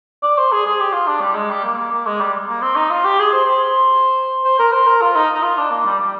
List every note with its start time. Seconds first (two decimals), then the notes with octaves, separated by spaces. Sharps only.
0.23 D5
0.38 C5
0.52 G#4
0.66 G#4
0.80 G4
0.93 F4
1.07 D4
1.21 G3
1.35 G#3
1.50 G3
1.64 A#3
1.78 A#3
1.91 A#3
2.06 G#3
2.20 G3
2.48 A#3
2.62 C4
2.76 D#4
2.90 F4
3.05 G4
3.19 G#4
3.33 C5
3.46 C5
4.44 C5
4.59 A#4
4.72 C5
4.87 A#4
5.02 F4
5.15 D#4
5.34 D#4
5.43 F4
5.57 D4
5.71 A#3
5.86 G3
6.00 G3